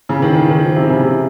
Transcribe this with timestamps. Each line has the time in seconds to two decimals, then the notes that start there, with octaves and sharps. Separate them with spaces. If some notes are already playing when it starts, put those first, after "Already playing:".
0.09 C#3
0.22 D#3
0.36 D#3
0.49 D#3
0.63 F3
0.76 C3
0.90 C#3
1.03 C3